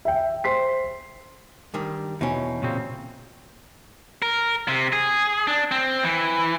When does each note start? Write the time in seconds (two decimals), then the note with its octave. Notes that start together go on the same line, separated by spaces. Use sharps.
0.05 E5 G5
0.44 C5 C6 B6 C7
1.74 G2 D#3 G3
2.21 E2 B2 C#4 D#4
2.62 A#2 C#3 C4
4.22 A#4
4.68 C3
4.93 G#4
5.47 D4
5.71 C4
6.04 E3